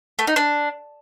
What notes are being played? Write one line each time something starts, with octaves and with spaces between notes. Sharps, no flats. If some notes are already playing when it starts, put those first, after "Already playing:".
A3
D#4
D4